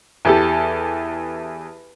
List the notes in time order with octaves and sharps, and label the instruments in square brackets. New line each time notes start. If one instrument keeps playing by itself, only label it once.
[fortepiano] E2 G4 A4